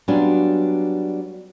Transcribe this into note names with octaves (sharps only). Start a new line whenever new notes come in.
F#3 G3 B3 C#4 D4 F4